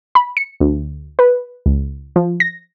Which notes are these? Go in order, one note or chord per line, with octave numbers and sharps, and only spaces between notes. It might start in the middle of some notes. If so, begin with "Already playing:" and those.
B5
C#7
D2
B4
C#2
F3
A#6